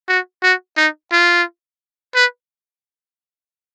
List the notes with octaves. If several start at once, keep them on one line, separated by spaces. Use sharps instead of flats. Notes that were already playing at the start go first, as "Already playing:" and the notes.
F#4
F#4
D#4
F4
B4